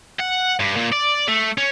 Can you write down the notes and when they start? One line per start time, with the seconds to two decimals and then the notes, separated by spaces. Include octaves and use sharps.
0.19 F#5
0.60 G2
0.76 A#2
0.93 D5
1.28 A3
1.58 C#4